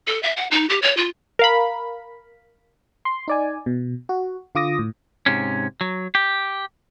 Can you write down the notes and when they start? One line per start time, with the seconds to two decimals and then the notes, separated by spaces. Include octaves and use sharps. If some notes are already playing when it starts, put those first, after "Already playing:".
0.07 A4
0.23 E5
0.37 F#5
0.51 D#4
0.69 G4
0.82 C#5
0.97 F4
1.39 A#4 F5 B5
3.05 C6
3.28 D#4 D5 G#5
3.66 B2
4.09 F#4
4.55 D3 F4 D6 D#6 A#6
4.79 A2
5.26 G#2 C3 C#4
5.81 F#3
6.15 G4